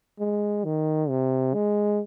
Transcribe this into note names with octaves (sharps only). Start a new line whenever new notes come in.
G#3
D#3
C3
G#3